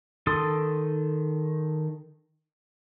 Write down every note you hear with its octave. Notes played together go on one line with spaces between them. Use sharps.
D#3 A4 C6 D#6